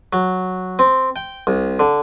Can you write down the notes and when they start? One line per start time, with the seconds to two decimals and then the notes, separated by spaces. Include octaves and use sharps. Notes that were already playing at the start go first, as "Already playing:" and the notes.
0.13 F#3
0.79 C4
1.16 G5
1.47 C2
1.79 D3